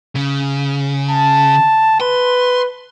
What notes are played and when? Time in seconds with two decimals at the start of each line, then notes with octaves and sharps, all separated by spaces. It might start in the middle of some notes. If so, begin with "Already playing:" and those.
0.16 C#3
1.10 A5
2.01 B4 C6